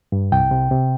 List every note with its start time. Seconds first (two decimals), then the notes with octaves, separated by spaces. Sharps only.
0.12 G2
0.32 C2 G5
0.51 C3
0.71 C3